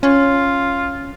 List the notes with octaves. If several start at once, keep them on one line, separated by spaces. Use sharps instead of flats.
C#4 F4